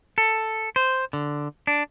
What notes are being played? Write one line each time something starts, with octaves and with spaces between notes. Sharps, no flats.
A4
C5
D3
D4